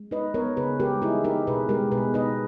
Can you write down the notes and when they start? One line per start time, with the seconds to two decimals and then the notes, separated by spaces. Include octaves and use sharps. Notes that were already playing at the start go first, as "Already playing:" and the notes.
Already playing: G#3
0.11 D#4 B4 D#5
0.34 B3 A#4 C#5
0.57 C#3 G#4 B4
0.80 G#3 G4 A#4
1.02 D#4 E4 G#4
1.24 D#4 G4 A#4
1.47 B2 G#4 B4
1.69 G#3 G4 A#4
1.92 B2 G#4 B4
2.14 D#4 B4 D#5